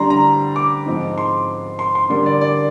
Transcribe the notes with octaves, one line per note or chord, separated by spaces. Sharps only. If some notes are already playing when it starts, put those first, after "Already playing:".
Already playing: D3 G3 D4 A#5 C6
A#5
D6
G#2 F3 C4 D#4
C6
C6
C6
D3 G3 A#3 D4 C6
D5
D5